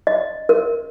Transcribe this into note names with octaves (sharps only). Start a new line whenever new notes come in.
D#5
A#4